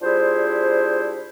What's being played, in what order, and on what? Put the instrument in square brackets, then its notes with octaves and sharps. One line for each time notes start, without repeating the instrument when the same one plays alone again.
[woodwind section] G3 D4 E4 F4 G#4 C5